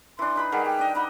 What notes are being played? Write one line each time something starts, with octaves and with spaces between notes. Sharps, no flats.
E3 D4 C6
D#4 B4 B5
D#3 G3 G#4 F#5
G4 G5
D4 D#5
D#4 D#5 F#5 B5